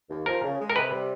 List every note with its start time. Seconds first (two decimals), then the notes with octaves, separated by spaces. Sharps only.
0.10 D#2
0.26 F3 A#4
0.43 C#3
0.60 G#3
0.70 A#4
0.76 C3 B4
0.92 G3